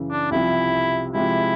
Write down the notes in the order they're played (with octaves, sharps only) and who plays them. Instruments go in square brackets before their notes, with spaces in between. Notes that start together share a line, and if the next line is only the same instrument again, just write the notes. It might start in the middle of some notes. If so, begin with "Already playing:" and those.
Already playing: [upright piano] F#2 C#3 E3
[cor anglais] D4
[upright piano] C2 C3 F3 [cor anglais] E4
[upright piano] C3 F3 G#3 [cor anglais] E4